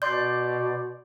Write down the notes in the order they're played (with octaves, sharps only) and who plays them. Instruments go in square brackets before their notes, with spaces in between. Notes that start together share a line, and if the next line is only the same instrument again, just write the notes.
[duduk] B2 [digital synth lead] D5 [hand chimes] C6 G6